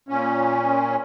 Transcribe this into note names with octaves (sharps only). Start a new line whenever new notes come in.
A#2 C#4